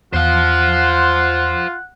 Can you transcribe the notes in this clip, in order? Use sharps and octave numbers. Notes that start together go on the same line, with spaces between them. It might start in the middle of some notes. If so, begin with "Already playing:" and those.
E2 F4 C5 F5 F#5